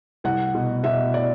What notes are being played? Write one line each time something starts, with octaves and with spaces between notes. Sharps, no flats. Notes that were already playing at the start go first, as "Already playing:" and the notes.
C2 F#5
B2
B2 E5
D5